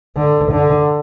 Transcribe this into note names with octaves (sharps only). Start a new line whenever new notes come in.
D3
D3